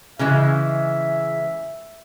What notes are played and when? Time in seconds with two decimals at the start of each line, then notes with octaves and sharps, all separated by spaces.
0.19 C#3 E3 G#3 E5